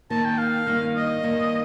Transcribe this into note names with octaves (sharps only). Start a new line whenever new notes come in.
D#3 A#3 D#4 A5
G5
F5
G2 D#3 G3 A#3 D#4
D#5
G2 D#3 A#3 D4